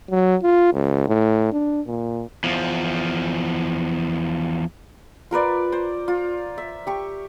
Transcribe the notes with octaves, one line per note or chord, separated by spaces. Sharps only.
F#3
F4
C#2
A2
D4
A#2
E2 F3
F4 A#4 B4 D5
C5
F4
E5
G4 C#6